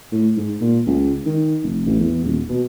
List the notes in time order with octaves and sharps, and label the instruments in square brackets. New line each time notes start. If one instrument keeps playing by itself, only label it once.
[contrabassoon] A2
G#2
A#2
C#2
D#3
F1
A1
E2
D#1
B2